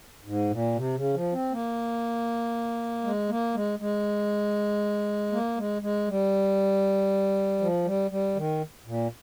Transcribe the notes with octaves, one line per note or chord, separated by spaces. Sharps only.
G#2
A#2
C3
C#3
F3
C4
A#3
G#3
A#3
G#3
G#3
A#3
G#3
G#3
G3
F3
G3
G3
D#3
A#2